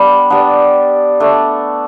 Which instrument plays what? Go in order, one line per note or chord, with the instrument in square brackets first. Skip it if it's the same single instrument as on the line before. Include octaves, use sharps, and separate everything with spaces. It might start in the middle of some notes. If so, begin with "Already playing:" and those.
Already playing: [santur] G3 B3 D4 B5 D6
G3 B3 D4
A3 D4